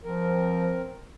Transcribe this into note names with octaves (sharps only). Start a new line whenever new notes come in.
F3 C4 A#4